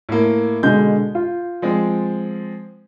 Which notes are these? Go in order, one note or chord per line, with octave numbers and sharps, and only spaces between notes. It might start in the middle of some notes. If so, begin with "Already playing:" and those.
A2 A#3
B2 D3 G#3 G6
F4
F3 G#3 C4